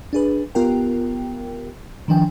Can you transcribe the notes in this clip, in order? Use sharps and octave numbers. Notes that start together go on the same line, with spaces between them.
D4 G#4 B4
B3 F4 G4 A#4 G5
D#3 F3 D4 G5 G#5